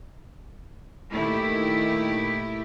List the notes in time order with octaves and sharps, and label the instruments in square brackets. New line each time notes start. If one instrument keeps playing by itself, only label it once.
[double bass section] A#2 D#3 [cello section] A3 E4 G4